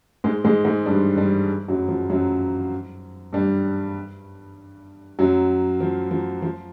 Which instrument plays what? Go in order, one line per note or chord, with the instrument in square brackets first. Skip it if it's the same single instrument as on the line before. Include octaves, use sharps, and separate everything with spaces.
[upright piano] G#2 G#3
G#2 G#3
G#2 G#3
G2 G3
G2 G3
F#2 F#3
F3
F#2 F#3
G2 G3
F#2 F#3
F3
F3
F3